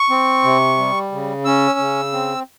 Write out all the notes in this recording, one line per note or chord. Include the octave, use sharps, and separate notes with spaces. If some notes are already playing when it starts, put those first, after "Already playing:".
Already playing: C#6
C4
C3
G3
C#3
C#4 E6
C#3
C4